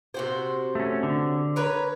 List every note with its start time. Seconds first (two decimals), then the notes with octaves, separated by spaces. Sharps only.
0.14 C3 F#4 C5
0.75 A3 C#4
1.03 D3
1.56 A#4 B4 C#5